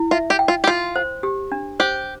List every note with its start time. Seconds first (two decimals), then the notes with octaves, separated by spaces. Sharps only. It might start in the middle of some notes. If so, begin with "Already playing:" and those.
Already playing: E4
0.11 F4 E5
0.30 G4
0.39 G5
0.48 F4
0.64 G4
0.67 F4 C6
0.96 C5
1.23 G4
1.52 D4
1.80 G4 C5